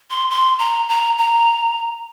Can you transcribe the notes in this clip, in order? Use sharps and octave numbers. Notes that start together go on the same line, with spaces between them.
C6
C6
A#5
A#5
A#5